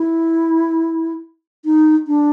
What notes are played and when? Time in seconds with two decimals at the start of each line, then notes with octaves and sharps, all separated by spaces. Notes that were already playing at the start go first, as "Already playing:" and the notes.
Already playing: E4
1.65 D#4
2.07 D4